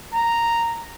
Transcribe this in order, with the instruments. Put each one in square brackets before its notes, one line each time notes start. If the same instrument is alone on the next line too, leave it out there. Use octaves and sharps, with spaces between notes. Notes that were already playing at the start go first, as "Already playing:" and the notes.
[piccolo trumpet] A#5